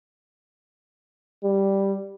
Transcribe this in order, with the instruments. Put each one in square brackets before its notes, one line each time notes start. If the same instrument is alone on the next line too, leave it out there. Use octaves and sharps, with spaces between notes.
[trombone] G3